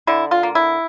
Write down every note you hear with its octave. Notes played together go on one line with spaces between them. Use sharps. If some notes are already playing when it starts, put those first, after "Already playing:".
D3 E4
F4
A#3
E4